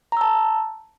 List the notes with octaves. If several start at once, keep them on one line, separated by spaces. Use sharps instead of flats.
A5 A#5 E6